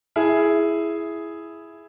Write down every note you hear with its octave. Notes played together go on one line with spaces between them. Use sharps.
E4 G#4